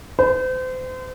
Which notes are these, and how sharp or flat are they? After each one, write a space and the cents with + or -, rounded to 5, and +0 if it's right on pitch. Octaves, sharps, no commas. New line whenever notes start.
C5 -35